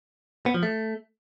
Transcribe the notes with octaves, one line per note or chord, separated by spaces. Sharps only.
B3
F3
A3